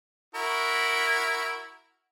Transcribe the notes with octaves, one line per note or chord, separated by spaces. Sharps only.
E4 F#4 A#4